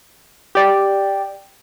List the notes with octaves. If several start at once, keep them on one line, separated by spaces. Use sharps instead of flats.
G4 D5